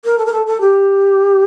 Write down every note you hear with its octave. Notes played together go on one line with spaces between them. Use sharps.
A#4
A4
A#4
A4
A4
G4